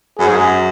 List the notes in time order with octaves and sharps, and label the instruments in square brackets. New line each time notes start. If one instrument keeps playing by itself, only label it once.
[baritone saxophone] F#2 [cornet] G#4
[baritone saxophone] G#2
F#2